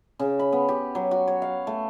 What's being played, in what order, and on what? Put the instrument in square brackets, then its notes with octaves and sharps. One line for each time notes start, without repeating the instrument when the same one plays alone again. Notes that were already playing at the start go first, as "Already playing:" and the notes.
[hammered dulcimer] C#3
B5
B3
G4
F#3
F#4
C#5
F5
A3